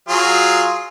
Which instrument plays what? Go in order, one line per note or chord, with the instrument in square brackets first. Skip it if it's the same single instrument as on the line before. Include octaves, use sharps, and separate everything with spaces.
[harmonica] F#3 F4 G#4